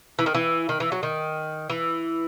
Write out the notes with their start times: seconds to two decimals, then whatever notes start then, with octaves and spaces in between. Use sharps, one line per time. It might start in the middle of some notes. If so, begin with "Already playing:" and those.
0.19 E3
0.26 D#3
0.35 E3
0.69 D#3
0.80 E3
0.92 F#3
1.03 D#3
1.70 E3